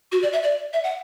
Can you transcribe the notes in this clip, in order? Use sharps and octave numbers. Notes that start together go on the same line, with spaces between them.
F#4
D5
E5
D5
E5
F#5